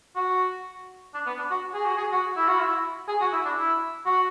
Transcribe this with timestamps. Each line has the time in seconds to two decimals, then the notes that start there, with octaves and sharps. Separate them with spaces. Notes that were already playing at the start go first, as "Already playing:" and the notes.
0.16 F#4
1.14 D4
1.26 B3
1.38 D4
1.50 F#4
1.74 G#4
1.85 F#4
1.97 G#4
2.12 F#4
2.36 E4
2.48 F#4
2.59 E4
3.08 G#4
3.21 F#4
3.32 E4
3.45 D4
3.58 E4
4.06 F#4